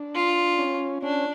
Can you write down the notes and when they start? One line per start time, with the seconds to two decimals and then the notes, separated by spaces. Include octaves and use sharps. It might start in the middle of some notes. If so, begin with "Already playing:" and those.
Already playing: D4
0.15 F4
0.58 C#4
1.03 C#4 D4